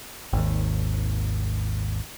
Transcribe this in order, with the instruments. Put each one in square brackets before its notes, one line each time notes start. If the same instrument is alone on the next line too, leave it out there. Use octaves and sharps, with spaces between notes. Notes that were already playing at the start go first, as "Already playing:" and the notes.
[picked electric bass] G#1 D#2